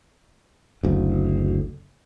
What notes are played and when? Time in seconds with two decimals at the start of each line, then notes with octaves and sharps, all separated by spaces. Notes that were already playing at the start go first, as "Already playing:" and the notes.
0.83 F#1 D2